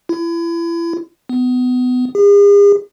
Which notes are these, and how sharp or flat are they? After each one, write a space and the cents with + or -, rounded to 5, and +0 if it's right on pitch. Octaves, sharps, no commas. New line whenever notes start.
E4 +35
B3 +25
G#4 -45